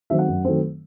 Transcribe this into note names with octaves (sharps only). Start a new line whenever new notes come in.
D#3 F#3 A3 C4 E5
F#5
F#2
D#3 F#3 A3 C4